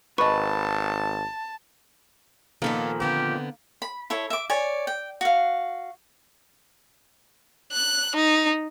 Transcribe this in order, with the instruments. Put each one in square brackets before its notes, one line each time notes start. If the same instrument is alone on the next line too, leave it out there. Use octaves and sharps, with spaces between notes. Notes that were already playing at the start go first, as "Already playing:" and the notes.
[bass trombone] G#1 [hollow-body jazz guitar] B4 [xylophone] D#5 C#6 [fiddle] A5
[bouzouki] A#2 D#3 F3 [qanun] A#3 B5 [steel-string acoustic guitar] B3 A4
[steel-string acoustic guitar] D3 B3 C4 [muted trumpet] G4
[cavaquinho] B5
E4 A4 C#5
E5 D6
C#5 D5 G#5
G5
F#4 F5
[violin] F#6
D#4